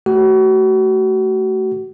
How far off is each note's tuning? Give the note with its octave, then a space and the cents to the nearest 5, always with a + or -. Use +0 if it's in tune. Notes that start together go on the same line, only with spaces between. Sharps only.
A3 +0 F#4 +35